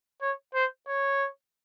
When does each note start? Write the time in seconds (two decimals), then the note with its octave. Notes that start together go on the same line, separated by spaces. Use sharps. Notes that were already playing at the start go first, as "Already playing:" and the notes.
0.22 C#5
0.55 C5
0.88 C#5